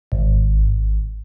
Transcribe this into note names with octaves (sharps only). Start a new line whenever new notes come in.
G#1